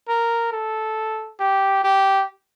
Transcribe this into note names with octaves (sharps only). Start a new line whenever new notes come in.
A#4
A4
G4
G4